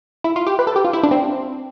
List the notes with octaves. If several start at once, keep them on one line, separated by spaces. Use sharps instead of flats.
E4
F4
G4
B4
A4
G4
F4
E4
D4
C4